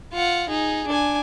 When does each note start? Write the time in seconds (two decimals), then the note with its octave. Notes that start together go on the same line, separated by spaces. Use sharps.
0.13 F4 F#5
0.49 D#4 G#4
0.88 D4 G#5